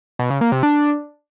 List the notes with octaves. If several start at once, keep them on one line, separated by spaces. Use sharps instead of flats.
B2
C#3
A#3
C3
D4